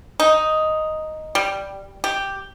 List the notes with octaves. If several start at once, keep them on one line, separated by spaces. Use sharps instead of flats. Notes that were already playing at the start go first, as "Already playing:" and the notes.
D#4
G3
G4